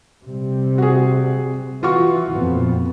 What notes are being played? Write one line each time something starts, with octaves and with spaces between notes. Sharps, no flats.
C3 G3
F#4 G#4
E3 F4 F#4 C#6
F2 A#2 B3